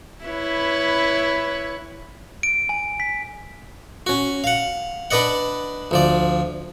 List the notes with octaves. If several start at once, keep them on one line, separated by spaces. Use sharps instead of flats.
E4 B4 C#5
D7
G#5
B6
C#4 F#4
F5 F#5
D4 B4 D5 D#5 F#5
D2 F3 D5